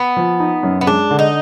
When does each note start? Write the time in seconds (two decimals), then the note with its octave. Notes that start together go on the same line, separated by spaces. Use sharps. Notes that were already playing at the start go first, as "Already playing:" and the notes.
Already playing: B3
0.17 F3
0.40 D#4
0.63 F#2
0.81 B3
0.87 G#3 D4
1.11 D3
1.19 D#4